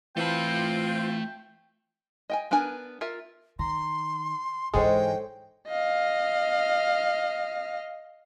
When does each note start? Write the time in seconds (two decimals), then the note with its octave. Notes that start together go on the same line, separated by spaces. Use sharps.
0.17 E3 A3 C4 F4 G5 A5 B5
2.30 D#5 G5 G#5
2.51 B3 D4 A#4 G#5
3.01 F4 A#4 E5
3.59 D#3 A#5 C6
4.74 G#2 E3 G#3 A4 C5 C#5 G5
5.68 D#5 F5